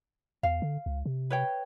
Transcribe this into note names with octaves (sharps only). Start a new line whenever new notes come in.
E2 F5
D3
C#2
C3
B4 C#5 G5